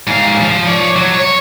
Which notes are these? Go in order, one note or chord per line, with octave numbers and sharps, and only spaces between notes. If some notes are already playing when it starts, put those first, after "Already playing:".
G#2 F5
F3
C#5 D5
F#3
C#5